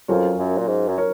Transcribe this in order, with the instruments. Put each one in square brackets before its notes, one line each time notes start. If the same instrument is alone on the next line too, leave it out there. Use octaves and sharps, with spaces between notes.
[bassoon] F2 [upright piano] F#3 C#4 F4 A#4 C#5
[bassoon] F#2
A#2
G#2
F#2
[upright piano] A#4 C#5